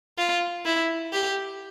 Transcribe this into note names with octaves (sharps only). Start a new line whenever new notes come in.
F4
E4
G4